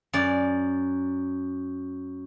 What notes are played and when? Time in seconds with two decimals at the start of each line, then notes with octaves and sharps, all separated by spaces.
0.13 F#2 D5